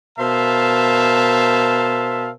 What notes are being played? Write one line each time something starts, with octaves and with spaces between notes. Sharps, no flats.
B2 A#4 C5 E5 F5 A5